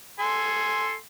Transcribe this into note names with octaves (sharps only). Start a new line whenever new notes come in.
A4 G#5 C6